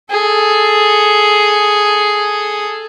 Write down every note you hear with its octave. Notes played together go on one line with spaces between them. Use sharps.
G#4 A4